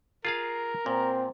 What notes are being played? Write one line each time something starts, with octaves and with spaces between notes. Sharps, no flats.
F4 G#4 A#4 F5
A#2 C4